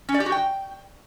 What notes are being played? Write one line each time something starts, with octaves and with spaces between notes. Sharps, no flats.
C#4
D5
G4
F#4
G5